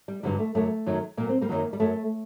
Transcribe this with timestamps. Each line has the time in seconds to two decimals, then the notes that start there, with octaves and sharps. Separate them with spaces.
0.08 G3
0.23 G2 D3 F#3 G3
0.39 A3
0.55 F#2 D3 F#3 A3
0.86 F#2 D#3 F#3
1.17 A#2 F#3 A#3
1.29 C4
1.41 G3 A#3
1.49 F#2 D#3 F#3
1.73 G3
1.80 F#2 F#3 A3